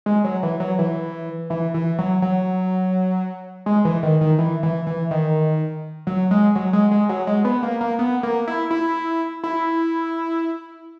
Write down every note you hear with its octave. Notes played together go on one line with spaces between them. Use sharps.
G#3
F#3
E3
F#3
E3
E3
E3
F#3
F#3
G#3
E3
D#3
D#3
E3
E3
E3
D#3
F#3
G#3
F#3
G#3
G#3
F#3
G#3
B3
A#3
A#3
B3
A#3
E4
E4
E4